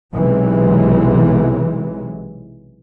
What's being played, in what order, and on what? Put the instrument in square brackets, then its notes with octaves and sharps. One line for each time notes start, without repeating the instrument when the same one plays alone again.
[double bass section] B1 C3 E3 F#3 G#3